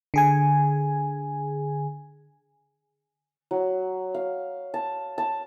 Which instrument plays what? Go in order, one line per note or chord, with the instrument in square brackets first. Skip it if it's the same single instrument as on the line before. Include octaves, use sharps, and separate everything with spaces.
[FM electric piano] D3 G#4 G#5
[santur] F#3
F5
A5
A5